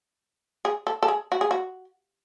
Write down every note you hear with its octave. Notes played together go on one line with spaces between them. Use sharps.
G#4
A4
A4
G#4
F#4
G#4
F#4